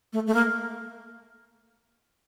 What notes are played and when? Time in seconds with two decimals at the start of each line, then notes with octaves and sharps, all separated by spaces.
0.13 A3
0.27 A3
0.34 A#3